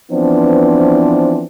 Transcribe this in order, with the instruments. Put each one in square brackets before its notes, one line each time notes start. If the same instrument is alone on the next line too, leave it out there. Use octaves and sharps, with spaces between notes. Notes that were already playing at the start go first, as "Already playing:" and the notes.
[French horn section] E3 F3 B3 C4 D4